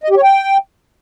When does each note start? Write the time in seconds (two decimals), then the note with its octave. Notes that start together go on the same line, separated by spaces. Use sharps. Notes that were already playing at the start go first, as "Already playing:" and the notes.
0.04 D#5
0.10 G4
0.17 C#5
0.23 G5